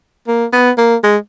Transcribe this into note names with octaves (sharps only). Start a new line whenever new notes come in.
A#3
B3
A#3
G#3